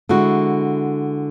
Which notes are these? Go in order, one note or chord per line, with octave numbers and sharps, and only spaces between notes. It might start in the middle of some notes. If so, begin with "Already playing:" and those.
D3 G#3 E4 F#4